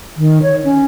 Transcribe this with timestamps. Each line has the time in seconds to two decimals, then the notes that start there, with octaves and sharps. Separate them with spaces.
0.18 D#3
0.42 C#5
0.64 C#4